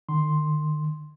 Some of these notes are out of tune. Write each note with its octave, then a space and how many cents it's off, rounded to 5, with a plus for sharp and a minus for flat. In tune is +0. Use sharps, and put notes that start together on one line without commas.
D#3 -40 C6 +0